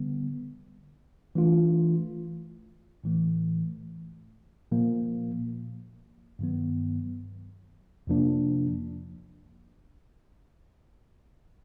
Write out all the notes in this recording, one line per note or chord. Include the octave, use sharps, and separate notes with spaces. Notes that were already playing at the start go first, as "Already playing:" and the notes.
Already playing: D3 G3 B3
E3 A3 D4 F4
A2 E3 A3
A#2 F3 A#3
G2 D#3 F#3 B3
F2 C3 F3 A#3 D4